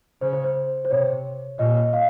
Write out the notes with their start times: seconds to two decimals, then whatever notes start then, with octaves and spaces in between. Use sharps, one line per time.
0.21 C#3 C5
0.33 C5
0.44 C5
0.85 C5
0.90 C3 C#5
1.58 A#2 D#5
1.93 F5